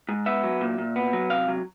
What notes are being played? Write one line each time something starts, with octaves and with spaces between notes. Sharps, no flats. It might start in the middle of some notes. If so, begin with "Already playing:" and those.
G#2
B3 E5
F#3
A#2
A#2
B3
F#3
C3 F5
F#3